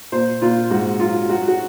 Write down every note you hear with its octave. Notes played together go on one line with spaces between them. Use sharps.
A#2 C5
A#2 F4
G#2 F#4
F#3 F4
F#3 F#4
F#4